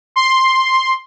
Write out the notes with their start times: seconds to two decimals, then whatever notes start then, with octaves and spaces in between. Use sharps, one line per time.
0.16 C6